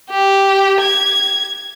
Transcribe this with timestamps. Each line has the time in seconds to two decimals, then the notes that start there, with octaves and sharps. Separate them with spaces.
0.10 G4
0.80 G#6